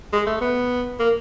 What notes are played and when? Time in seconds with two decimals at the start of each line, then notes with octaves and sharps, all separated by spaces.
0.13 G#3
0.27 A3
0.41 B3
1.00 A#3